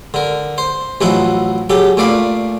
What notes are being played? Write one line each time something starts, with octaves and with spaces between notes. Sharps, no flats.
D3 A#4
C5
A1 F3 F#3 D#4 E4 F#5
C#3 F#3 G4 A4
A#2 A3 D5 F5 B5